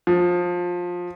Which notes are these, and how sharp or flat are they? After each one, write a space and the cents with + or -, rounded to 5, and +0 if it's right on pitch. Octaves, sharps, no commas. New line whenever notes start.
F3 +20